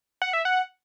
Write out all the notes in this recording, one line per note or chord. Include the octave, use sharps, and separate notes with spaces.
F#5
E5
F#5